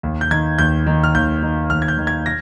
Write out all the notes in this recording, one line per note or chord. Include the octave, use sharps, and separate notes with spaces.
D#2
G6
D#3 G#6
D#2 G6
D#3
F6
D#2 G6
D#3
D#2 F6
G#6
G6
D#3
G#6
A#6